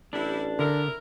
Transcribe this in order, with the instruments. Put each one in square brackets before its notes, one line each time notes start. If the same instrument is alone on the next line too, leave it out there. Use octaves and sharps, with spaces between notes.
[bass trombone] A1 [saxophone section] G3 E4 [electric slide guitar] D4
[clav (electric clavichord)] D3 [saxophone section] E4 A#4